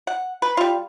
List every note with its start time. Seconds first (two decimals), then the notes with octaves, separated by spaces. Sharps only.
0.07 F#5
0.42 B4
0.57 G3 F4